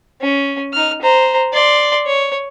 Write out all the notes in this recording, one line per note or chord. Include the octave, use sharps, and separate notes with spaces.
C#4
D#4 F6
C5 A#5
D5 C6
C#5